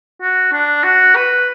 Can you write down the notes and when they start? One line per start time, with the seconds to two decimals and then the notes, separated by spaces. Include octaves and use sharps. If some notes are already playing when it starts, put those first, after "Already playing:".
0.22 F#4
0.53 D4
0.84 F#4
1.16 B4